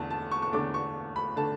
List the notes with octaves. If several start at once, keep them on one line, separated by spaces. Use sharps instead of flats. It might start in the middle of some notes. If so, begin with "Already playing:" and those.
Already playing: E2 D3 A3 A5
A5
C#6
C#6
E2 D3 A3 D6
C#6
B5
D3 A3 A5